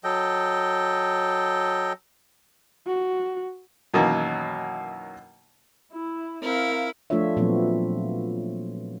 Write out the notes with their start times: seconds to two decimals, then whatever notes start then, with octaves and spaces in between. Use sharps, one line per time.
0.04 F#3 A4 D#5 G5
2.86 F#4
3.94 F#2 B2 D#3 E3 F#3 A#3
5.94 E4
6.43 C4 E4 A#4 F5
7.10 F3 A3 D4 F4 C#5 E5
7.37 A#2 F3 F#3 A3 B3 C4